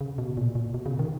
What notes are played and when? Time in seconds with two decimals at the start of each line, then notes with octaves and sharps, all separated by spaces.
0.01 C#3
0.18 B2
0.37 A#2
0.55 A#2
0.74 B2
0.86 C#3
0.99 D#3